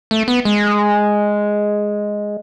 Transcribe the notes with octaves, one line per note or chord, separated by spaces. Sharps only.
A3
B3
G#3